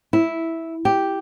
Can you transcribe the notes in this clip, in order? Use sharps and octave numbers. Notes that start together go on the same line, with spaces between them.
E4
G4